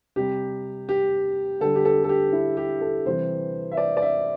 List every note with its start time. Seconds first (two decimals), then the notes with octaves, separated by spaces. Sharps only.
0.16 C3 G3 G4
0.89 G4
1.60 D3 G3 A4
1.76 G4
1.85 A4
2.04 A4
2.09 G4
2.33 E4
2.57 G4
2.81 A4
3.05 C3 E3 G3 C5
3.72 E5
3.77 D5
3.97 D5
4.02 E5